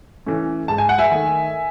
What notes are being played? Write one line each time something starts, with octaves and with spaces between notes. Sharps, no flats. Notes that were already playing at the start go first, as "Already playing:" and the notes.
E3 A3 C#4
G#2 A5
G#5
F#5
E5 G#5
D#3 A3